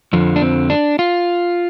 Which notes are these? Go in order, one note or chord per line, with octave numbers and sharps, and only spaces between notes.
F2 D3 F3
D4
C4
D4
F4